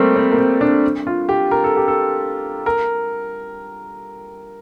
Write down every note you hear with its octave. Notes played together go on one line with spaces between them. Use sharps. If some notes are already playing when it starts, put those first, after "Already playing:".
Already playing: G3 A3 A#3 C4
C4
A#3
C4
D4
F4
G4
A#4
A4
G4
A4
A#4